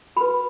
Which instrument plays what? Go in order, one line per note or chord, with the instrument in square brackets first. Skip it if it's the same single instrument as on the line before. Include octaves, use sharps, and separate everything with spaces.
[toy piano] F#4 B4 B5